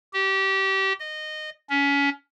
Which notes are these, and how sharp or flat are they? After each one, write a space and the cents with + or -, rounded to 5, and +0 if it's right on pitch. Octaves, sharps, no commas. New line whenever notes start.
G4 -25
D#5 -20
C#4 +25